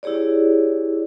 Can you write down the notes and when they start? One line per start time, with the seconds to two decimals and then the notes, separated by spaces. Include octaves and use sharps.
0.03 E4 G4 G#4 C#5 D5